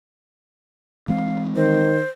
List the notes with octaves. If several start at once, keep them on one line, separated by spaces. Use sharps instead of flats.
E3 G#3 C4 F5
D#3 C5